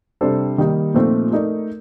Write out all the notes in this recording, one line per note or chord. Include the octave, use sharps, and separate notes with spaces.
C3 G3 D4 A4 C5
D#3 G3 A#3 D#4
A#2 F3 A3 C4 D#4
A3 D#4 A#4 D5